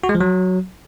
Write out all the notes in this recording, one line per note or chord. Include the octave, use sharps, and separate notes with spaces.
F#4
G#3
F3
F#3